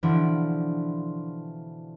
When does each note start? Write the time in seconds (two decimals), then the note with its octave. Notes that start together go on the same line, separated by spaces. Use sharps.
0.03 B2 D3 E3 F3 D4 E4